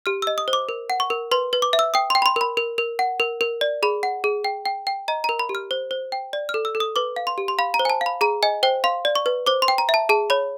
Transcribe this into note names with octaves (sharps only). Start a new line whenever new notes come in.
G4 F6
D#5 E6
D#6
C5
D6
A#4
F#5
C#6
A#4
B4 C6
B4
D6
E5
E6
G5 D#6
G5 C6
B5
C6
A#4 B5
A#4
A#4
F#5
A#4
A#4
D5
G#4 B5
F#5
G#4
G5
G5
G5
D#5 A#5
A#4 A#5
B5
G4
F6
C5
C5
G5
D5
F6
A4
E6
A4
D#6
B4 D6
F5
C6
G4
C6
F5 B5
A#5
C5
G#5
A5
F5
B5
G#4 A#5
D#5 G#5
C5 G5
F5 C6
D5
C#6
B4
C5 D6
C6
G5
A#5
E5
A5
G#4 A5
C#5 B5